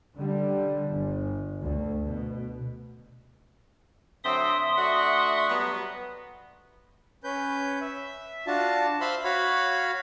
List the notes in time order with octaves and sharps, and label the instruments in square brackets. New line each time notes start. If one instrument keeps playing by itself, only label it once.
[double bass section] D3 G3
G1
D2
B2
[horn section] D3 F#3 C4 [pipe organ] E5 C6 D#6
[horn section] A3 D4 F#4
F#3 G3 B3
[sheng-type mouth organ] C#4 B4 G6
E5
D4 F4 F#4 A5
C5 E5 F5 B5 C6
F#4 C#5 F5 B5